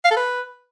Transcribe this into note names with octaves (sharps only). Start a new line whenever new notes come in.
F5
A4
B4